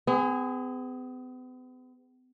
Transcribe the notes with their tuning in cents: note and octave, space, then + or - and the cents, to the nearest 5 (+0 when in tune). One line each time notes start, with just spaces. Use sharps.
B3 +45 G#4 -15